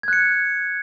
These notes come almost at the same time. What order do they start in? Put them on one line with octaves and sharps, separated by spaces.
G#6 F#6 C#7